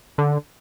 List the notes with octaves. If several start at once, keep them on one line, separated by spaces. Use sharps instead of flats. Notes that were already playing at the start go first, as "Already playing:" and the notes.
D3